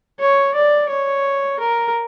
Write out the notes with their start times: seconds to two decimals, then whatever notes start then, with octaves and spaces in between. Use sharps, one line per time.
0.19 C#5
0.54 D5
0.90 C#5
1.59 A#4